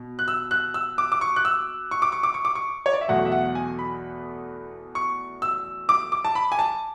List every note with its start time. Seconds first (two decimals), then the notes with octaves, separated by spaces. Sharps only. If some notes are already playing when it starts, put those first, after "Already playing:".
Already playing: B2
0.19 F#6
0.28 E6
0.51 F#6
0.74 E6
0.98 D6
1.12 D6
1.21 C#6
1.36 F#6
1.45 E6
1.91 C#6
2.02 D6
2.12 C#6
2.23 D6
2.34 C#6
2.45 D6
2.55 C#6
2.86 C#5
2.93 D5
3.01 E5
3.08 E2 B2 F#3 A3 F#5
3.25 E5
3.32 F#5
3.55 G#5
3.79 B5
4.95 C#6
5.42 E6
5.89 D6
6.12 D6
6.25 A5
6.35 B5
6.52 G#5
6.59 A5